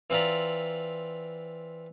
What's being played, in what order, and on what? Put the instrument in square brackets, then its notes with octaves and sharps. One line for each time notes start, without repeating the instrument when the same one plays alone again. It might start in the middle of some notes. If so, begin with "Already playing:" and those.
[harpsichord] E3 C4 F4 D5 A#5 B5